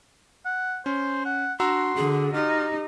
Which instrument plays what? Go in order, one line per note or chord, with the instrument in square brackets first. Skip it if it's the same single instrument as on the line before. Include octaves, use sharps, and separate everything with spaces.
[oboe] F#5
[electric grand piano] C#4 [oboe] C5
[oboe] F#5
[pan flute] D4 [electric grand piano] F#4 A#5 E6 [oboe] C6
[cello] D3 [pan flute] G#4
[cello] D#4 [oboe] F4 [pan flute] G4